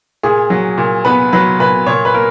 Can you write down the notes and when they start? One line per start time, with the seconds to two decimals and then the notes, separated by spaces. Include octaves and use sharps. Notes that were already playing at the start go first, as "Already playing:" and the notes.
0.23 A#2 G#4
0.50 F#3
0.78 A#2
1.05 B3 B4
1.33 F#3 B4
1.59 A#2 B4
1.86 A#2 C#5
2.05 B4
2.14 A#3 A#4